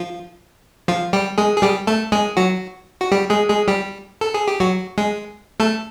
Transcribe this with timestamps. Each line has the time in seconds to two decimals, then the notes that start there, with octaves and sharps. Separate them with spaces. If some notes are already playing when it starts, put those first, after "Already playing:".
Already playing: F3 F4
0.88 F3 F4
1.13 G3 G4
1.38 G#3 G#4
1.57 G#4
1.62 G3 G4
1.87 A3 A4
2.12 G#3 G#4
2.37 F#3 F#4
3.01 F#4
3.12 G3 G4
3.30 G#3 G#4
3.49 G#3 G#4
3.68 G3 G4
4.21 A4
4.34 G#4
4.48 G4
4.60 F#3 F#4
4.98 G#3 G#4
5.60 A3 A4